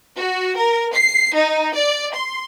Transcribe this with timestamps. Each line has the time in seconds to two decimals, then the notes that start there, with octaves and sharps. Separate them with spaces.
0.17 F#4
0.58 A#4
0.95 C7
1.35 D#4
1.75 D5
2.16 C6